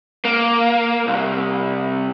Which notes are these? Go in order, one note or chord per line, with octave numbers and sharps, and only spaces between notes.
A#3
C2